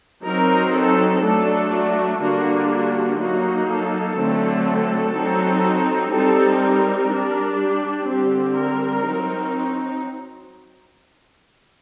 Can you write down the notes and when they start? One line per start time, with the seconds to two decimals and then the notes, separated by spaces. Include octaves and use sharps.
0.25 F#3 C4 D#4 A#4
0.74 A4
1.22 F#3 A3 D4 A4
1.72 F#4
2.20 D3 G3 A#3 D4 F#4
2.70 F#4
3.19 F#3 A#3 D#4 F#4
3.68 A4
4.17 D3 F#3 A3 C4
4.65 A4
5.14 F#3 C4 D#4
6.12 G3 C4 D#4 A4
6.61 A#4
7.10 G3 D4
7.59 G4
8.08 D3 G3 C4 G4
8.57 A#4
9.05 F#3 C4 D#4